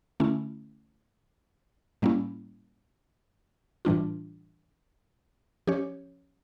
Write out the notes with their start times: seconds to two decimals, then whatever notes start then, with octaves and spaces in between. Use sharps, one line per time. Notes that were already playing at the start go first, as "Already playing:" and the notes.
0.20 D3 A3 C#4 E4
2.02 A2 G3 A#3 C#4 E4
3.85 A2 E3 G3 D4 F4
5.67 F3 C#4 G4 C#5